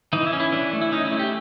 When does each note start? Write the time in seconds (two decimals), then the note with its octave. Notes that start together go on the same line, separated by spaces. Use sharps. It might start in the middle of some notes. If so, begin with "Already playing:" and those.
0.13 E3 D#4
0.26 E4
0.33 C#4
0.40 E4
0.52 E3 D4
0.73 A3
0.81 E4
0.92 C#4 D#4
1.05 E4
1.12 A3
1.19 G4